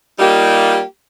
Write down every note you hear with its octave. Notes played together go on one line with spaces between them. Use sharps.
G3 A#3 D#4 F4 G4